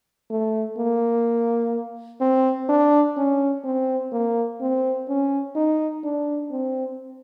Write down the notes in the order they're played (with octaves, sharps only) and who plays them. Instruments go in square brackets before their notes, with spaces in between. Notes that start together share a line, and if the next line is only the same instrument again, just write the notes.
[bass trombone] A3
A#3
C4
D4
C#4
C4
A#3
C4
C#4
D#4
D4
C4